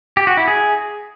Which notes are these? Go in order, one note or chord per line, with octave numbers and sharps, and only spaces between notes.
G4
F#4
E4
G#4